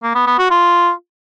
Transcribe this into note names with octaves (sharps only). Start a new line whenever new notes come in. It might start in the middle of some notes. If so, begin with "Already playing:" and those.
A#3
B3
B3
F#4
F4